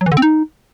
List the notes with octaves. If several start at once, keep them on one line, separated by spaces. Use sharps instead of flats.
F#3
E3
D3
C4
D#4